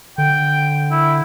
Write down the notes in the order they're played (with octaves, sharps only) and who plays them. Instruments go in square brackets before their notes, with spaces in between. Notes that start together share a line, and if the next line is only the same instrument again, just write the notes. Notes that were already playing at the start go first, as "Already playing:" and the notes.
[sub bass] D3 [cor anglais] G5
[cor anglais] E4